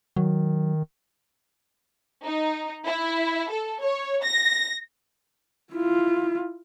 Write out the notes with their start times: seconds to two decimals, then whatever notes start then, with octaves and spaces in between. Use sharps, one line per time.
0.17 D#3 F#3
2.24 D#4
2.86 E4
3.50 A4
3.81 C#5
4.23 A#6
5.72 E4 F4